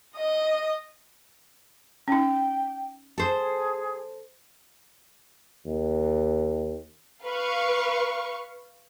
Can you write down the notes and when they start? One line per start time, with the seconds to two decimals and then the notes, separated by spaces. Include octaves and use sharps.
0.16 D#5 D#6
2.08 C#4 D#4 G5
3.18 G#4 A4 C5
5.66 D#2
7.24 B4 F5 C#6